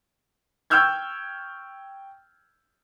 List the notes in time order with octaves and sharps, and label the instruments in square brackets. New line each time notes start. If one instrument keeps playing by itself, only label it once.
[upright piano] G5 C#6 E6 F6 G6 G#6